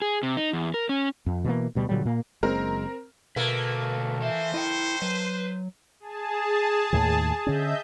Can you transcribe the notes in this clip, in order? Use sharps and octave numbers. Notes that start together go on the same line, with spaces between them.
G#4
C3
D#4
E2
A#4
C#4
F2
B2 E3 F#3 A#3
D2 B2 G3
A#2 D3 F#3 G3
A#2 A#3
F#1 G#3 C4 A#4
D2 B2 A3 A#3 B4
E3 C5 E5
E4 D#5 G5
F#3 B4
G#4 A5
D#2 A2 D#3
D3 C#4 D#5 E5 G6